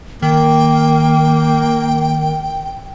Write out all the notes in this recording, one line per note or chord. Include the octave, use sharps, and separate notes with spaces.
D#3 A#3 G5